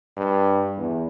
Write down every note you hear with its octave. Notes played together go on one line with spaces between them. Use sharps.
G2
E2